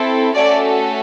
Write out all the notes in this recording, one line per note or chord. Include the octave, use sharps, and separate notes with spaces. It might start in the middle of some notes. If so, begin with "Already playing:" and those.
Already playing: C4 E4 A4
A3 C#4 F#4 A4 D5